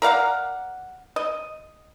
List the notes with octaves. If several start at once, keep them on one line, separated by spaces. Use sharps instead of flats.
A#4 D5 F5 F#5
D#5